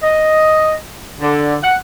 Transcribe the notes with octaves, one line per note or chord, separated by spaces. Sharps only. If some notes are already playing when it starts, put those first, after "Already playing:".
D#5
D3
F#5